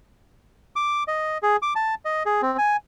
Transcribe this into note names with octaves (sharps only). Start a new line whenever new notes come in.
D6
D#5
G#4
D6
A5
D#5
G#4
C4
G#5